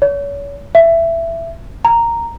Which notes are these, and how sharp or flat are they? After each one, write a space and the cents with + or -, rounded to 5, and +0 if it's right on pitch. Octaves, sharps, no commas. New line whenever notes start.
C#5 +35
E5 +15
A#5 -5